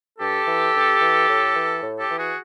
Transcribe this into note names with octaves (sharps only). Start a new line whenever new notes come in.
G2 G4 A4
E3
G2
E3
A2
E3
A2
G4 A4
E3
F#4 G#4